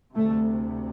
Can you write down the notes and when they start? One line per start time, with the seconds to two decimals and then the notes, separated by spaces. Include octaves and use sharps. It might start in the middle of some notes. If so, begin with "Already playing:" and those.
0.15 D2 C3 A3